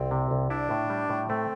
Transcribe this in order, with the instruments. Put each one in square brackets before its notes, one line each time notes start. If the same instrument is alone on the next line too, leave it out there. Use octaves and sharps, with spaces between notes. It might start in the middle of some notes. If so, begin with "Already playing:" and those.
Already playing: [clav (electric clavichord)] C2 [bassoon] C4
[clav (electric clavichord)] C3
C2
[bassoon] D4 [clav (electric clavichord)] E4
[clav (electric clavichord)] A2
G3
A2
[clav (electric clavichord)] A3 [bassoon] C4